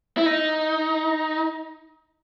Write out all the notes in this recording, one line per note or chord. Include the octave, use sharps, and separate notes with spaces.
E4
D#4